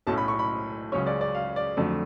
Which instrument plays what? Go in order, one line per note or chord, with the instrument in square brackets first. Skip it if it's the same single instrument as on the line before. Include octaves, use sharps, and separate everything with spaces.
[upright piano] B1 A2 F#3 A3 C#4 A5
B5
C#6
B5
C#2 C#3 F#3 C#4 C#5
D5
D5
F5
D5
F2 D3 F#3 A3